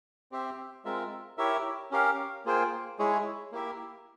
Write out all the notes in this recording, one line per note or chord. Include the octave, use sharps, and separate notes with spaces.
C4 G4 C5 E5
G#3 C4 F4 A#4 E5
E4 G4 A#4 C#5 E5
C#4 G4 A#4 F5
A#3 F4 G#4 C5 G5
G#3 E4 G#4 C#5
A#3 E4 G4 A#4 E5